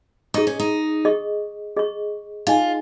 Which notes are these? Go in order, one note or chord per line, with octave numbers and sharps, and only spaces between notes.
D#4 G#4 D#5 C#6
C#4
D#4
G#4 D#5 C#6
G#4 D#5 C#6
D#4 F4 G#4 D#5 G#5